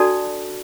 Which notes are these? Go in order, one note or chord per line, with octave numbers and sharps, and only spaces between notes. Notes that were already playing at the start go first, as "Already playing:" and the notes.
Already playing: D4 F#4 A4 D5 A5